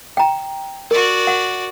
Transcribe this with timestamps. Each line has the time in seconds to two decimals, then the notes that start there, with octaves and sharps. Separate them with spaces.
0.17 G5 A#5
0.91 F#4 A#4 D5
1.27 F#5